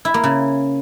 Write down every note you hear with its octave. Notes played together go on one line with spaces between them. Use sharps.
E4
A#3
C#3